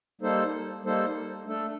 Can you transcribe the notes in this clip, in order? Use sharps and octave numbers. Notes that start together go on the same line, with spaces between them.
G3 A#3 D#4 A4 C5
G3 A#3 D#4 A4 C5
A3 D4 A4